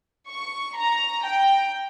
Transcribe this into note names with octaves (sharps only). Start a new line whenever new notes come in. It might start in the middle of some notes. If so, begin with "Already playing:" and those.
C#6
A#5
G5